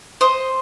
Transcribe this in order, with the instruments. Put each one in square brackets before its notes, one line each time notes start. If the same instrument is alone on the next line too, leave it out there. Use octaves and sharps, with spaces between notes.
[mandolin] C5 D#5